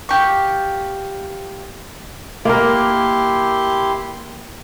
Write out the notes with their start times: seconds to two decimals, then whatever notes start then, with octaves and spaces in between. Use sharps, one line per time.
0.09 F4 G4 C#6
2.45 A#3 E4 G4 A#4 C6